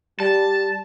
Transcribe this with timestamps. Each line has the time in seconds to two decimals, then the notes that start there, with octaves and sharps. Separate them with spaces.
0.20 G3 A5